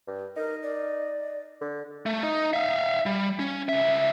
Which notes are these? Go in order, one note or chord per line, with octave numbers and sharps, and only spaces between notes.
G2
D#4 A#4
D5
D3
A3
D#4
E5 F5
G3
C#4
C#2 E5